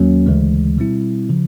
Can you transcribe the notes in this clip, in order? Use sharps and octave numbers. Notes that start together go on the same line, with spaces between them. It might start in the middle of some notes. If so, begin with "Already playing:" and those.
Already playing: D#2 F#3 A#3 C#4
D2 C#3 E3 G#3
B2 G3 C4 E4
C#3 F3